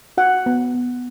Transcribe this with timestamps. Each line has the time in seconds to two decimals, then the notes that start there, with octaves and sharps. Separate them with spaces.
0.18 F#4 F#5
0.46 B3
0.74 B3